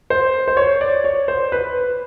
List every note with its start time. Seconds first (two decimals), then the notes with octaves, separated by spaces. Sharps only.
0.10 C5
0.48 C5
0.57 C#5
0.81 D5
1.04 C#5
1.28 C5
1.52 B4